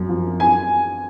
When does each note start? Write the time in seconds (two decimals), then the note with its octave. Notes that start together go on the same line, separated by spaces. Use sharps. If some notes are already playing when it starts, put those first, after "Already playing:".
Already playing: F#2
0.09 F3
0.40 G#5